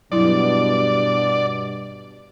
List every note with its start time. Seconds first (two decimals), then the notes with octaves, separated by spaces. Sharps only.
0.12 G2 B2 F#3 E4 D5